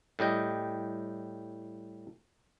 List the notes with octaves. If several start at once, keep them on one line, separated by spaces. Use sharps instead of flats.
A2 G3 D#5 G5